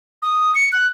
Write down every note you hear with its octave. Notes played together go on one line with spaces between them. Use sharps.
D#6
C#7
F#6